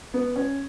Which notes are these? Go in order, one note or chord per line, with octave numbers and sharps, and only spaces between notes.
B3
C#4